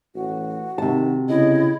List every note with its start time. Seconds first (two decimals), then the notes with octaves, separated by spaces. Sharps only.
0.15 A1 F#4
0.78 C3 D#3 A5
1.29 C#3 E4 D#5